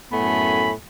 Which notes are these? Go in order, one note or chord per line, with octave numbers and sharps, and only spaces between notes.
F#2 A2 A3 B3 G#5 B5